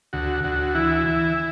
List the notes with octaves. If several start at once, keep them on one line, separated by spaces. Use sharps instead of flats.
D2 F#4
D2 F#4
E3 E4
E3